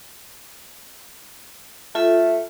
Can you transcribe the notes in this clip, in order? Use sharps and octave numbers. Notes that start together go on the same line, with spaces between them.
A3 F4 A4 E5